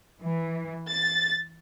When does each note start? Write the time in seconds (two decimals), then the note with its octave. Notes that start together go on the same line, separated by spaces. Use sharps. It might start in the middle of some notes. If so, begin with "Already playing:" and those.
0.22 E3
0.89 A6